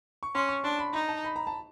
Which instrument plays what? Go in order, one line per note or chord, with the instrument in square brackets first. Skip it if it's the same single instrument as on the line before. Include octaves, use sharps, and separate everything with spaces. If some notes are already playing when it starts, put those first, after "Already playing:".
[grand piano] C#6
[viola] C#4 [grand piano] C6
[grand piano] C#6
[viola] D4 [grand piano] C6
[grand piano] B5
[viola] D#4 [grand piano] A#5
[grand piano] A5
B5
A#5
A5